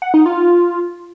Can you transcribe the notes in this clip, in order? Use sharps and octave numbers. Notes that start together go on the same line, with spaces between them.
F#5
D#4
F4